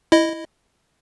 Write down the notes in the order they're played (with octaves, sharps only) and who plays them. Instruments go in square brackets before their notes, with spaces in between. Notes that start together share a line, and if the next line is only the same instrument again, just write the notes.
[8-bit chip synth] E4 D#5